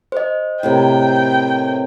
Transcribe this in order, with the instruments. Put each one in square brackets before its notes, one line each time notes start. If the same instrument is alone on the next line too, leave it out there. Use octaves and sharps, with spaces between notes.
[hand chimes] C5 D#5
[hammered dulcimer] A2 C3 A#4 [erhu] G5